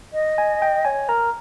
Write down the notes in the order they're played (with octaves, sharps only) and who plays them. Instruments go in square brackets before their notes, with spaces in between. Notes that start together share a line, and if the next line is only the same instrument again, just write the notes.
[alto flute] D#5
[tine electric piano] G#5
G5
[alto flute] C#5 [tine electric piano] G#5
[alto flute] A#4 [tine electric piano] A#5